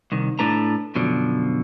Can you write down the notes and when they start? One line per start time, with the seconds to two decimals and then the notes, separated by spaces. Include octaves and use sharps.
0.12 C2 D#3
0.39 A2 D4 A4 B4 A#5
0.95 F#2 B2 D3 F3